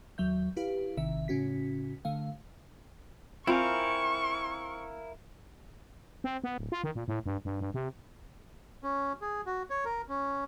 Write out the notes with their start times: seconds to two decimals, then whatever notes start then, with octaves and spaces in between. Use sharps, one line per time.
0.18 D#2 F#3 E5 G6
0.57 E4 G4 B4 F5
0.97 A1 C3 D#3 E5
1.28 A2 C#3 C#4 F#4 B6
2.05 D3 A3 F5
3.47 C4 E4 F4 A#4 F5 G#5 C#6
6.24 C4
6.44 B3
6.58 D1
6.72 F4
6.84 D#3
6.95 A#2
7.08 A2
7.26 G2
7.45 G2
7.60 G2
7.74 C3
8.83 C#4
9.22 G#4
9.46 F#4
9.70 C#5
9.85 A#4
10.09 C#4